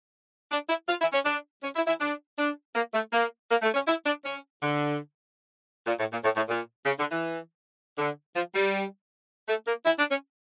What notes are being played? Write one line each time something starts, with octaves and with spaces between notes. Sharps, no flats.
D4
E4
F4
E4
C#4
D4
C#4
E4
E4
D4
D4
A#3
A3
A#3
A#3
A3
C#4
E4
D4
C#4
D3
A#2
A2
A#2
A2
A2
A#2
C#3
D3
E3
D3
F3
G3
A3
A#3
E4
D4
C#4